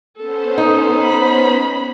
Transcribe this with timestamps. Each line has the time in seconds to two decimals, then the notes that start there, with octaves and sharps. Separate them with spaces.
0.17 B3 C#4 A4 C5
0.58 D#4
1.03 B5